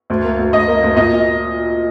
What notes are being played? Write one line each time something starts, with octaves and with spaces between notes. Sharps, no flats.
D2
A#3
D2
D2 D#5
A#3
D2
A#2 D#5